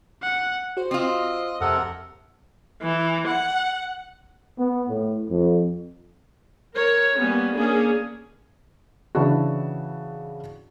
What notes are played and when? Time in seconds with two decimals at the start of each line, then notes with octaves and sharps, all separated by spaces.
0.23 F#5
0.77 F#4 C5
0.91 C4 F4 D#5
1.61 F2 C3 A4 A#4 F#5
2.82 E3
3.27 F#5
4.58 B3
4.89 A2
5.30 F2
6.74 A#4 C#5
7.18 G3 A#3 B3 C#4
7.55 A#3 C#4 D4 G#4
9.15 C#3 E3 D4 E4 F#4